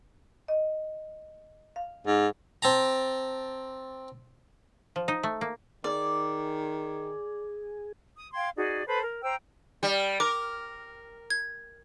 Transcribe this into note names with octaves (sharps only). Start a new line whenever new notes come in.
D#5
F5
G#2
C4 A5 A#5
F3
D#4
A3
A#3
D#3 G#4 D5
D#6
F5 G5 C6 G#6
D#4 F#4 G#4 D5
A4 B4 C5 B5
A#4
C5 G5 A#5 E6
G3
A#4 D6
G#6